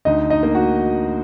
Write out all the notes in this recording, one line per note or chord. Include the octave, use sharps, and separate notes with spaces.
D2 D#4 D#5
D#4 D#5
A#3
F#4 F#5